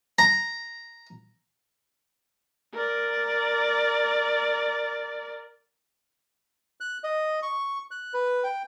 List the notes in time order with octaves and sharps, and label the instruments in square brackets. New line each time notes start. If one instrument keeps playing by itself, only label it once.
[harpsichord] A#5
[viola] A#4 D5
[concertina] F#6
D#5
C#6
F#6
B4
G5